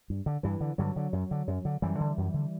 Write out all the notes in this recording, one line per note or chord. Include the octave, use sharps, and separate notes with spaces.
G2
D3
G2 E3
D3
G2 D3 F#3
D3
F#2
D3
F#2
D3
F#2 E3 G3
D3
F#2
D3